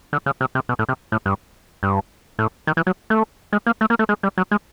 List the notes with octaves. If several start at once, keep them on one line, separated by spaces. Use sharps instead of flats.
D3
C#3
C3
C3
B2
A2
C3
A2
G2
G2
A2
D#3
E3
F#3
A3
G#3
A#3
A3
A#3
A3
G#3
G3
F#3
G#3